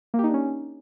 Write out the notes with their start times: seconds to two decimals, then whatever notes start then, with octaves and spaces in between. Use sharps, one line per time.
0.14 A#3
0.19 G4
0.24 D#4
0.29 D4
0.34 C#4